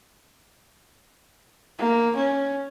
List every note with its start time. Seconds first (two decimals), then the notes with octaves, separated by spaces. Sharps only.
1.79 A#3
2.16 C#4